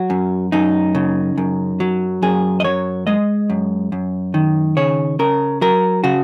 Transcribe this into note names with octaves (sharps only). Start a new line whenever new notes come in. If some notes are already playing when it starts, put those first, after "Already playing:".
Already playing: F#3 F#4
F#2
F#2 D#4
C#3
F#2
F#3
F#2 G#4
D#5
F#3 C#5
G#3 D#5
F#2
F#2
D#3
C#3 C#5
C#3 A#4
F#3 A#4
C#3 F#4